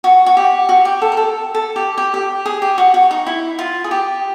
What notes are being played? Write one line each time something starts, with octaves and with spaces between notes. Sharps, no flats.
F#4
F#4
G4
F#4
G4
A4
A#4
A4
A4
G4
G4
G4
G#4
G4
F#4
F#4
D#4
E4
F4
G#4
G4